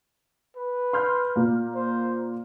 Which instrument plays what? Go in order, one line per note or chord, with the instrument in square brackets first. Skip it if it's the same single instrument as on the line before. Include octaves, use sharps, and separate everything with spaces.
[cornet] B4
[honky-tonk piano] C6 F6 G6
A#2 A#3
[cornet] C5